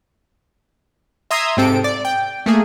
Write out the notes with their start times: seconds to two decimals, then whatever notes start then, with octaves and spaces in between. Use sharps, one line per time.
1.31 E5 A#5 C6 D#6 E6 G#6
1.57 G#2 C3 C4 A4 D7
1.84 D5
2.05 G5
2.46 A3 A#3 G#4